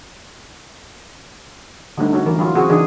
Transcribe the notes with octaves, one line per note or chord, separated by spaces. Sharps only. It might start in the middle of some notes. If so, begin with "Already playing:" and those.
D3 G3 A3 D#4
C#4 D#4 F#4
E3 A#4
F#3 E4 F4
C#3 C4 F#4 G#4
C#3 E3 D4 D#4 G#4